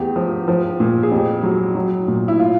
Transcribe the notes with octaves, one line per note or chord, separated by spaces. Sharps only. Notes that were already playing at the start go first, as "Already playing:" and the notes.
Already playing: E2 G4
F3
F3
A#2
G#4
F2 G4
F#3
F#3
A#2
E4
F4